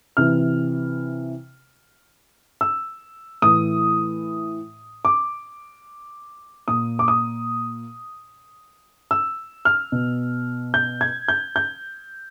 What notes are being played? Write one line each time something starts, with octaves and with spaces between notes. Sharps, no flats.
C3 E3 F6
E6
A2 E3 D#6
D6
A#2 D#6
D6
D#6
E6
F6
B2
G6
G#6
G6
G6